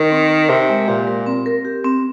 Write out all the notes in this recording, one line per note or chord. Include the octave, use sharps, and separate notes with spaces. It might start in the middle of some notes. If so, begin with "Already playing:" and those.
Already playing: D#3
C4
A#4
C3 A#4
G#3
A#2 G4
A#4
C4
A#4
G4
C4